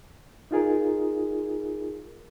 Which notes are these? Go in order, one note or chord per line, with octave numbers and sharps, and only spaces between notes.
D#4 F4 G#4 A#4